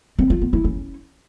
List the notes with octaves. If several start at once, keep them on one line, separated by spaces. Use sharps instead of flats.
C4
F4
B3
E4
C#4